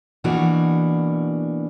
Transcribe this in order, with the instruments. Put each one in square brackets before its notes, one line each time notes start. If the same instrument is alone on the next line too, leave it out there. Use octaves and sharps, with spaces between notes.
[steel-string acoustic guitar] B2 E3 A#3 D4 F#4